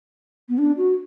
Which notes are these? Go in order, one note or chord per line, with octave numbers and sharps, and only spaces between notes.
B3
D4
F#4